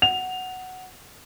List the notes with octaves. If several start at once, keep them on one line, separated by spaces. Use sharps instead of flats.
F#5 F7